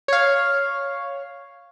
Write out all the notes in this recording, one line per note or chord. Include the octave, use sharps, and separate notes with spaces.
C#5 F5